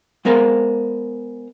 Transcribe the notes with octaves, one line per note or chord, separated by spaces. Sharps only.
G#3 B3 A#4 C5 F5